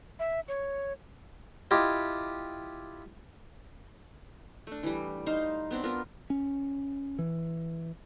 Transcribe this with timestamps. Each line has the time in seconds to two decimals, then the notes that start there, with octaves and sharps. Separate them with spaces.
0.19 E5
0.48 C#5
1.71 E4 F4 G4 D#5
4.67 A3 D4
4.83 E3 G3
5.26 D#4 C5 F5
5.71 B3 C4 D4
5.83 B3 F4 A#4
6.30 C#4
7.19 E3